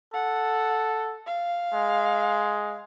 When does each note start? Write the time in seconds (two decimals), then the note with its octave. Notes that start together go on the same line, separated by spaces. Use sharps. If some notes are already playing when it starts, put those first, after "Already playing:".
0.14 A4 F#5
1.26 F5
1.74 G#3